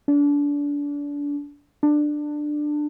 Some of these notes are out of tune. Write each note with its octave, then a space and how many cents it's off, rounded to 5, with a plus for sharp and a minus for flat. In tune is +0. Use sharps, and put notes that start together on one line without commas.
D4 -30
D4 +15